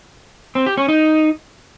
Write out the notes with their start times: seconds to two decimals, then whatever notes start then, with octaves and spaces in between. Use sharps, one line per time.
0.55 C4
0.66 G4
0.77 C#4
0.89 D#4